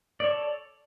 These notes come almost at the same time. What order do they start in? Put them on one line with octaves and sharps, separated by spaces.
D5 C#5 A4